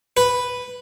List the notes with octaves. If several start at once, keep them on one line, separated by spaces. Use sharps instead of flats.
B4